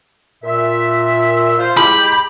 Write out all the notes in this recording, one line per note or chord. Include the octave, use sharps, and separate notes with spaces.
A#2 E5
F4 C5
G#3 E4 G4 B5